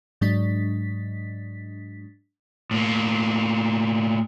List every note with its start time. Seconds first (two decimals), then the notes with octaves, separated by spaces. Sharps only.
0.21 G#2 F#3 G#3 D4 A6 B6
2.71 A2 A#3